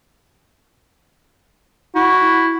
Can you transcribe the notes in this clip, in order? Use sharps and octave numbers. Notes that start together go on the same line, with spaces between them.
E4 F#4